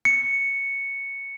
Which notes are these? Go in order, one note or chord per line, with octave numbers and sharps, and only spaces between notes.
C#7